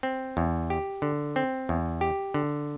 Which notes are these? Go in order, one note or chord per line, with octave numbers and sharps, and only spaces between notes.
C4
E2
G4
D3
C4
E2
G4
D3